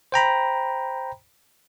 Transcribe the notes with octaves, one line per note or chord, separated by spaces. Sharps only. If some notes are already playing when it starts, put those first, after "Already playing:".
C5 G5 A#5 B5